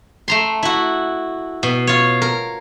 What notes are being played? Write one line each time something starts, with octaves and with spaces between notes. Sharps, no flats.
A3 A#5 C6
E4 F#4
B2
F4 C#5
A#4